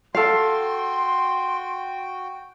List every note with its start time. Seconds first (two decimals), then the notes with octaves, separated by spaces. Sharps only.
0.15 F#4 A4 F5 G5 C6